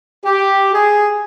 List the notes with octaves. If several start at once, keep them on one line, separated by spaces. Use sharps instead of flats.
G4
G#4